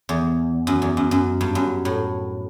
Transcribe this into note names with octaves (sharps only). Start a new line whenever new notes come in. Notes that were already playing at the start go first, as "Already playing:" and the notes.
E2
F#2
E2
F#2
F#2
G2
F#2
A2